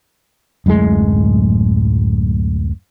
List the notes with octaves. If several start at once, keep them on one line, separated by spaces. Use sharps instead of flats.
D1 F#2 A2 G#3